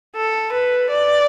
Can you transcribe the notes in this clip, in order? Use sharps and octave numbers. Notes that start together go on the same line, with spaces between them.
A4
B4
D5